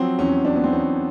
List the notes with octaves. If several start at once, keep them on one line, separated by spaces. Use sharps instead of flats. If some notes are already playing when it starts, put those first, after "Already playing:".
Already playing: F3 F#3 C4
E2 C#4
F#3 D4
B3
C4
E2 C#4